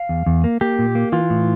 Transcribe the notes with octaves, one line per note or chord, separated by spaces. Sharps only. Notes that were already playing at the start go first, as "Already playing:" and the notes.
Already playing: F5
E2
E2
A#3
A#3 G4
A#2
A#3
E3 F4
A2